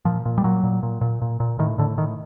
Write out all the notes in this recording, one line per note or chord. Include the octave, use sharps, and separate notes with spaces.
A#2 F3
A#2
G3
A#2 F#3
A#2
A#2
A#2
A#2
A#2
A2 D#3
A2 D3
A2 D#3